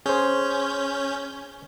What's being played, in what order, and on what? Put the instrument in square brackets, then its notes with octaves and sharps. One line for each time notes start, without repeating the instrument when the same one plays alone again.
[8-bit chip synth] C#4 G6 [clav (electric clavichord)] G#4 C5